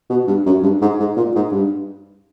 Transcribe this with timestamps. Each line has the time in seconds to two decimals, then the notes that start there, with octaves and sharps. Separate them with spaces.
0.10 B2
0.27 G2
0.46 F#2
0.63 G2
0.81 G#2
0.99 G#2
1.17 A#2
1.35 G#2
1.52 G2